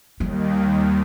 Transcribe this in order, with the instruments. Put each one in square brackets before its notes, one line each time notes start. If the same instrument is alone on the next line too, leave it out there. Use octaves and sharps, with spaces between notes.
[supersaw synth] D#2 D#3 [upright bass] G3